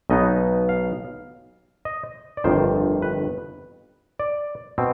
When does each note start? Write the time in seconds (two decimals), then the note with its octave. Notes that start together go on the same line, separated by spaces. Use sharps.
0.10 B1 B2 B3 D#4 D#5
0.69 F5
1.85 D#5
2.37 D5
2.44 G1 F2 D#3 C5
3.02 B4
4.20 D5
4.78 B2 C4